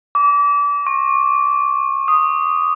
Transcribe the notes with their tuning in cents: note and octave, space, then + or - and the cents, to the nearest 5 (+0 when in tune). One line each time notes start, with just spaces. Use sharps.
D6 -30
C#6 -30
D#6 -5